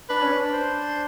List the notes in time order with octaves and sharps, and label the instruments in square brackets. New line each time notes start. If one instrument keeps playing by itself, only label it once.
[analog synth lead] D4 [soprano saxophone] B4
[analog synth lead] C#4
D4
[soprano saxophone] C5